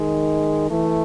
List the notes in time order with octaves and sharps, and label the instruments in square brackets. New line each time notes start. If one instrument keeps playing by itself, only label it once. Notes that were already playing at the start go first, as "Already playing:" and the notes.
Already playing: [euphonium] D#3 [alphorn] G#3
[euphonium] E3 [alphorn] A3